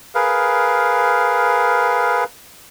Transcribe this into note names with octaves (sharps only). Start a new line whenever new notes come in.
G#4 A#4 B4 F5